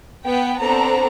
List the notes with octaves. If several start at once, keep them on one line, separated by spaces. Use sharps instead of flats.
B3 G5
B3 C4 D4 A4 C5 A#5